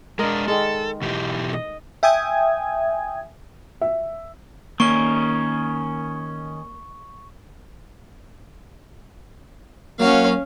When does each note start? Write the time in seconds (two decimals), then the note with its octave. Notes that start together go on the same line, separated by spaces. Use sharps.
0.19 G#3 D4 A#4 D5 D#5
0.48 D#3 G#3 A4
1.02 B2 E3 G4
1.53 D#5
2.03 E5 G5 G#5 D#6 G#6
3.81 E5
4.80 D#3 A#3 C#4 C#6 G7
10.00 F#3 A#3 C#4 F#4 F5